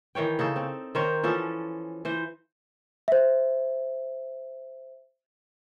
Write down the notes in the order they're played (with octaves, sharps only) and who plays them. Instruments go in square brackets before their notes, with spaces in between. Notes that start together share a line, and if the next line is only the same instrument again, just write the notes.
[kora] D#3 E3 C#5 G5
C#3 D#4 A4
C4
D#3 A#4 C5 C#5
E3 F3 C#4 A4
E3 C5
[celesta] C5 E5